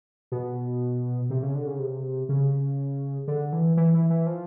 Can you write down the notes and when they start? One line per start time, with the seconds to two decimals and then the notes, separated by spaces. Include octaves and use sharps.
0.32 B2
1.30 C3
1.42 C#3
1.55 D3
1.67 C#3
1.79 C3
2.29 C#3
3.28 D3
3.53 E3
3.77 E3
3.94 E3
4.10 E3
4.27 F3